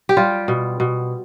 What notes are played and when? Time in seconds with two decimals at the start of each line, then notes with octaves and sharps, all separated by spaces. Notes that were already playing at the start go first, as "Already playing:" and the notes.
0.09 G4
0.17 G3 F4
0.48 B2
0.80 B2